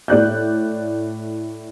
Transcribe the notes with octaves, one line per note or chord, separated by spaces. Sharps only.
A2 D5 F#6 G6